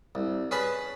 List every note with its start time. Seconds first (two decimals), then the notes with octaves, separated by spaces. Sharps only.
0.15 C2
0.51 C#4 G#4 B4 G#5 A5 B5